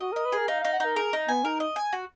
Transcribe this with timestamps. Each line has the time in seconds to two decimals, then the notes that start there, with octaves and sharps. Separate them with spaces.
0.01 F#4 D#5
0.12 A#4 D#5
0.25 B4
0.32 G#4 A#4
0.48 D#4 F5
0.60 D#4 F5
0.73 F#5
0.80 D#4 A#4
0.96 G#4 A#4
1.13 D#4
1.28 B3 G#5
1.44 D#4 A#4
1.60 D#5
1.76 G#5
1.93 F#4